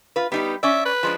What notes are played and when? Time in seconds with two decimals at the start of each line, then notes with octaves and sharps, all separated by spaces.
0.16 F4 B4
0.32 G3 B3 D#4 G4
0.63 C#4 D5 E5
0.86 B4
1.03 F3 G#3 D4